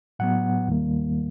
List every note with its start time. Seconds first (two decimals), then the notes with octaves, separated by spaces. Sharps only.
0.19 A2 F#3 B3 F#5
0.67 D#2 D#3 G3 A#3